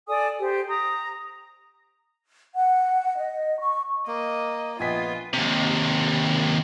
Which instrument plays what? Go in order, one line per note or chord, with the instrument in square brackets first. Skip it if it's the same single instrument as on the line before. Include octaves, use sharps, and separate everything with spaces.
[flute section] A4 D5 G#5 D#6
G4 C5
A#5 D#6
F#5
D#5
C#6
[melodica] A#3 [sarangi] D#5
[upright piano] A#1 D#5 B6 [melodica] B3 G#5 [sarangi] F4
[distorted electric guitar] D#2 C3